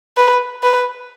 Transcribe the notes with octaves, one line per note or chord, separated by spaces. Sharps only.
B4
B4